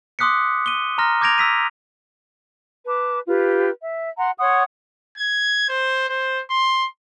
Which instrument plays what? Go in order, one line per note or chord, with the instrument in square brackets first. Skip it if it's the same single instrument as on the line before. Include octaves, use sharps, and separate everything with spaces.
[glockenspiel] C6 D6 D#6 F#6 B6 C#7
D#7 G7
A#5 C6 F6 A#6
D6 G6 G#6 A#6 D7 F7
E6 B6 D#7
[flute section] B4 A5 D6
F4 G4 B4
E5
F#5 A#5 C6
C#5 F#5 C6 D#6
[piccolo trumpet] G#6
C5
C5
C6